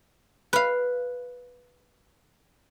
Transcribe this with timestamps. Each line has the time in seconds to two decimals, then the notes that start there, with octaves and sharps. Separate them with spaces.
0.53 B4 F5